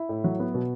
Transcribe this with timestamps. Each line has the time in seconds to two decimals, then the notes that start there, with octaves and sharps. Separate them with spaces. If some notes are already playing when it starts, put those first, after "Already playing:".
Already playing: E4
0.09 A2
0.24 F#3
0.40 B3
0.54 B2